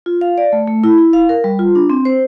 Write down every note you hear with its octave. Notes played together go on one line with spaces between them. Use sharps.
F4
F5
D5
A3
A3
E4
E4
F5
A#4
G3
F4
D4
C4
C5